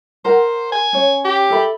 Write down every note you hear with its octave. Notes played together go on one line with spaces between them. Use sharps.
A#4 C5 F#5
G#5
C#4 C#5
G4
A4 E5 B5